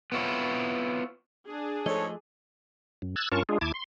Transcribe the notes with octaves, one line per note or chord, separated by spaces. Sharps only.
B3 C4 E4 F4 C#5
D4 G#4
G#2 F3 A3 A4 C#5 D#5
F#2
E6 F#6 G#6 A6
G2 C#4 F4 A#4 A5 C#6
G#3 D4 F4 G#4
D#2 E4 A5 D6 G#6
C6